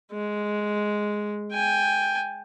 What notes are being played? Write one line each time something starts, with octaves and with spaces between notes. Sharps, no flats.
G#3
G5 G#5